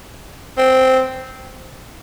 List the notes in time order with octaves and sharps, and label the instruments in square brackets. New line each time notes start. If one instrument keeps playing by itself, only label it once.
[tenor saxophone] C4